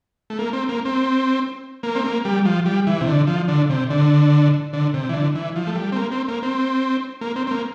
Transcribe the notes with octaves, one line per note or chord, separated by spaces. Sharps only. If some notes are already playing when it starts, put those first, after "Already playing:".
A3
A#3
C4
A#3
C4
A#3
C4
A#3
G3
F3
G3
E3
C3
D3
F3
D3
C3
D3
D3
C3
E3
D3
E3
F3
A3
G3
C4
A#3
C4
A#3
C4
A#3
C4
C4
A#3